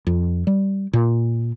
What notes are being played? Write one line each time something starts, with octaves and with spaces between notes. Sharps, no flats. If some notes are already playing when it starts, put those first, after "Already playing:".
F2
G3
A#2